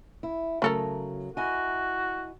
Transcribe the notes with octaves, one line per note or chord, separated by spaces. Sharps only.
E4
C#3 F#3 A3 A4 A#4
E4 F#4 D#5 G#5